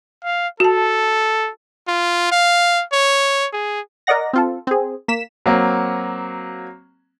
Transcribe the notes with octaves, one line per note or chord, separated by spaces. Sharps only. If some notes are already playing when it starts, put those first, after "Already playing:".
F5
F#4 A4 A5
F4
F5
C#5
G#4
A#4 D5 D#5 F#5 A#6
C4 F4 A4
C4 G#4
A#3 B6 E7
F#3 A#3 C4